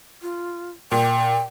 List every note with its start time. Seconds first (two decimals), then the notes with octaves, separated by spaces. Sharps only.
0.22 F4
0.92 A#2 G5